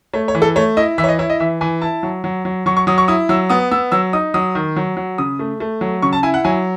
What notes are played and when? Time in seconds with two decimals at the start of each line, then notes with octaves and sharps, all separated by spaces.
0.14 A3 C#5
0.28 C#5
0.35 E3
0.42 A4
0.56 A3 C#5
0.77 E4 D#5
0.98 E3 E5
1.04 C#5
1.09 D#5
1.19 E4 C#5
1.30 D#5
1.40 E3 E5
1.61 E3 G#5
1.82 E4 A5
2.03 F#3
2.24 F#3
2.45 F#3
2.66 F#3 C#6
2.77 C#6
2.87 F#3 D#6
2.98 C#6
3.08 E4 D#6
3.29 F#3 E6
3.50 B3 D#6
3.71 B3 E6
3.92 F#3 E6
4.13 D#4 D#6
4.34 F#3 D#6
4.55 D#3
4.76 F#3
4.97 F#3
5.18 C#3 D#6
5.39 A3
5.60 A3
5.81 F#3
6.02 C#3 C#6
6.13 A5
6.23 E4 G#5
6.34 F#5
6.45 F#3 G#5